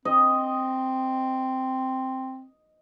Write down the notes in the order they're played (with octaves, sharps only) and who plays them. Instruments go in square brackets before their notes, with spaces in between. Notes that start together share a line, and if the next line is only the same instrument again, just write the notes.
[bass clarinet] C4 [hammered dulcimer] D#5